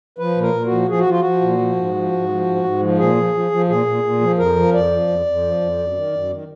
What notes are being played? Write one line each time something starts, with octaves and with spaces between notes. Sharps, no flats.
F3 B4
A#2
A#4
A#2
F#4
F3
F3 G#4
F#4
F3 F4
F3 F#4
A#2
F3
G#2
F3
G#2
F3
G#2
G#2
F3
A#2 G#4
F3
F3
F3
A#2 G#4
A#2
A#2
F3
F2 A#4
F3
F2 D5
F3
F2
F2
F3
F2
F#2
D#3
F#2
D#3